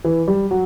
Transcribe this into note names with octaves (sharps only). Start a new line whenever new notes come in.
E3
G3
F#3